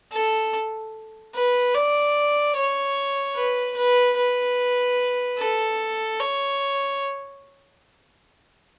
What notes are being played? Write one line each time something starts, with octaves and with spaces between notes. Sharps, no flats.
A4
B4
D5
C#5
B4
B4
B4
A4
C#5